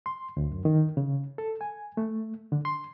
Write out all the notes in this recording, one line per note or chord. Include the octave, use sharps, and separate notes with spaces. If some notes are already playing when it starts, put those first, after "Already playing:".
C6
D2
F#2
D#3
C#3
A4
G#5
A3
D3
C6